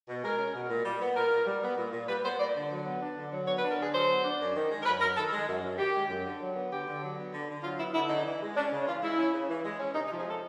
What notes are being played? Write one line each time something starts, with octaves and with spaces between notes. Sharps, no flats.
B2
G#3 A#4
C#4
B2
A#2
G3
B3
A#2 A#4
A#2
G3
B3
A#2
A#2
G3 B4
B3 C5
A#2 D5
D3
F#3
B3
D4
D3
F#3
B3 C#5
B4
D4
A#4
D3 G#4
F#3 C5
B3
D4
F#2
D#3
G#3
A#4
F#2 B4
F#2 A#4
D#3 A4
G#3
F#2
F#2
D#3 G4
G#3
F#2
D3
F#3
B3
D3 G4
D3
F#3
B3
D3
D3
F#3 F4
B3 E4
D3 E4
C#3 D#4
E3
G#3
C#4 D4
C#3
E3 F4
G#3 E4
C#4
C#3
E3
G#3
C#4
C3 D#4
D#4
F3
G#4
G#3 A4